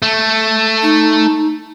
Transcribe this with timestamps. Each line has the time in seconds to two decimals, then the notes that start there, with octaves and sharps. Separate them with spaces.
0.02 A3
0.82 D#4